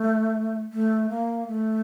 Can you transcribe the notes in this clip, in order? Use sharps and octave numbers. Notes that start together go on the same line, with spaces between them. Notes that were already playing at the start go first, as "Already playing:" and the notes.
Already playing: A3
A3
A#3
A3